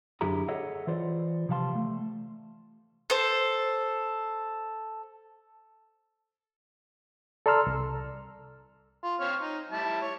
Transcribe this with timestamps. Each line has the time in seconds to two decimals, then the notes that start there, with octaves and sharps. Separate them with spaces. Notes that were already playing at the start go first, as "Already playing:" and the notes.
0.21 F#2 D3 E4 G4 G#4 A#5
0.48 G#4 A4 C#5 D#5 E5 F#5
0.87 E3 F4 C5 D5
1.49 C3 F3 G3 F5 A5 C6
1.75 A3
3.10 A4 C5
7.46 A4 D5 A#5 C6 E6 F6
7.66 C2
9.03 F4
9.20 C4 C#5 F6
9.40 D#4
9.70 G3 E4 A5
10.01 C#5